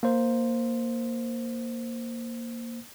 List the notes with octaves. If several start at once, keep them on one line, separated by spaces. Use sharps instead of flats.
A#3 C5